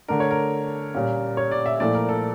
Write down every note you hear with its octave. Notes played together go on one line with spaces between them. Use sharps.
D3 A3 D4 A#4
C#5
A#4
A#2 G3 A#3 C#4
C#5
D5
E5
A#2 F3 A3 E4 D5
A#4
A4